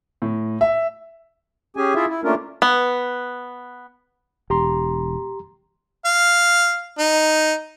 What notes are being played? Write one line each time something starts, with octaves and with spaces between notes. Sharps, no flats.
A2
E5
C#4 G4 G#4 G#5
E4 F4 G#4 E5
E4
A3 A#3 C#4 D4 F4 A#4
B3
E1 G4 A#5 C6
F5
D#4